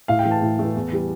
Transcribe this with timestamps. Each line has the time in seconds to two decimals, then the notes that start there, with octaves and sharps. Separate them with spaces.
0.08 A2 F5
0.19 G5
0.25 E3 A3
0.31 A5
0.42 A2
0.59 E3 A3
0.76 E2
0.92 E3 G3